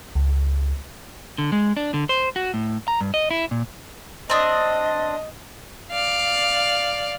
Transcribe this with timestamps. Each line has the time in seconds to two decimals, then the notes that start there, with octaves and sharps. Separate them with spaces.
0.15 C#2
1.38 D3
1.52 G#3
1.77 D4
1.94 D3
2.09 C5
2.36 F#4
2.54 A2
2.88 A#5
3.01 G2
3.14 D#5
3.31 E4
3.51 A#2
4.30 C4 D4 D#5 D#6
5.92 D5 F5